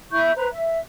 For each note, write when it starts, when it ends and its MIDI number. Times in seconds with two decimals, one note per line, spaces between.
0.12 0.31 64
0.12 0.31 76
0.12 0.31 85
0.12 0.31 91
0.37 0.47 71
0.37 0.47 72
0.37 0.47 82
0.52 0.79 76